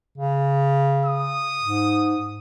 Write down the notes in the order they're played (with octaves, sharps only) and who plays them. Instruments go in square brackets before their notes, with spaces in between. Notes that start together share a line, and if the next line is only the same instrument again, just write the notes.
[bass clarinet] C#3
[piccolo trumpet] D#6
[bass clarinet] G#2